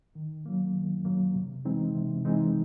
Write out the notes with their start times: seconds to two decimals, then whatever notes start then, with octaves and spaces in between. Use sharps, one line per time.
0.15 D#3
0.46 F#3 A#3
0.75 D#3
1.05 F#3 A#3
1.35 C3
1.65 E3 G#3 C4 D#4
1.94 C3
2.25 E3 G#3 C4 D#4